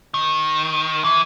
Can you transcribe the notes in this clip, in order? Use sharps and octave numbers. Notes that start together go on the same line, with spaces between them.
D#3
E3